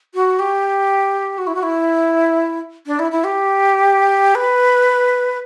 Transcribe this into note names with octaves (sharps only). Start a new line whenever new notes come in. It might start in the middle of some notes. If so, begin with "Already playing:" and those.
F#4
G4
F#4
E4
F#4
E4
D4
E4
E4
G4
B4